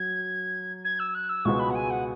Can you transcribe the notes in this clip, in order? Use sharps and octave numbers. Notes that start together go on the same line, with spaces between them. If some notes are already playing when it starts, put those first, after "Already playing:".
Already playing: F#3 G#6
G#6
E6
F#6
E6
C#2 B2 G#3 B3 C#6
B5
F#5
G#5
F#5